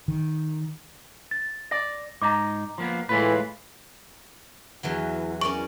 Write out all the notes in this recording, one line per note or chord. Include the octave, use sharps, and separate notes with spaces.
D#3
A6
D5 A#6
G#2 D#4 A#5 D6
F3 A#3 B3
A2 E3 G#3 F4 B4
E2 E3 F#3
C#4 A#4 D5 C#6